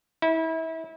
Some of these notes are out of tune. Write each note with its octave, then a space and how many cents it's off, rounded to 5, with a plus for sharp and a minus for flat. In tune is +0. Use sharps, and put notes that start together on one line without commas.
E4 -30